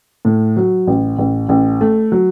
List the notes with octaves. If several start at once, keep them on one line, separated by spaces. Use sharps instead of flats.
A2
F#3
A1
A1
A1
A3
F#3